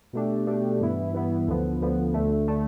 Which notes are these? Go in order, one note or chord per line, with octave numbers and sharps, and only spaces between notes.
B2 A3 D4 G4
B2 A3 D4 G4
G2 E3 B3 E4
G2 E3 B3 E4
D2 D3 F3 B3
D2 D3 F3 B3
D2 D3 A3
D3 A3